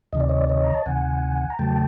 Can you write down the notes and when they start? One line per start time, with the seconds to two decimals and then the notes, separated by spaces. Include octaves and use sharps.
0.13 D2 C3 D#3 D#5
0.20 D5
0.29 C#5 D#5
0.40 D5
0.49 C#5 D#5
0.64 A#5
0.75 A5
0.86 D2 C3 D#3 F#5 G#5
1.50 A#5
1.59 E2 C#3 F#3 A3 G5 A5